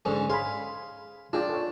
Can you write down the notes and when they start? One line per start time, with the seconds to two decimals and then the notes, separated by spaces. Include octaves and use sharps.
0.05 G#2 D3 C#4
0.30 G#4 F5 G#5 B5 C6
1.33 D4 F4 G#4 D5 G5
1.49 A4 C#5